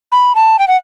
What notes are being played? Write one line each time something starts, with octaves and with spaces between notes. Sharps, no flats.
B5
A5
G5
F#5